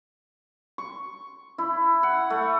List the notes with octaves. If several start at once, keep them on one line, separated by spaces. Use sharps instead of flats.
C#6
E4
F#5
A3